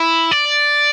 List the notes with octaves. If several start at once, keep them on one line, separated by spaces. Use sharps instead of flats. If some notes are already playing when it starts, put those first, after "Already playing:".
Already playing: E4
D5